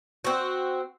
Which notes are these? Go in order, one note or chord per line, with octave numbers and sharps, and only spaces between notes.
C4 F#4